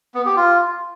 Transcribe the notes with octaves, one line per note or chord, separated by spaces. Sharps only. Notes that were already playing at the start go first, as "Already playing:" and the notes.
B3
G4
F4